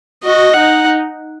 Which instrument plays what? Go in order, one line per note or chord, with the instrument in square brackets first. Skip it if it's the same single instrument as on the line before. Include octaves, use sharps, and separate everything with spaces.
[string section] F#4 [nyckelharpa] D#5
[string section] D#4 [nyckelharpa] F#5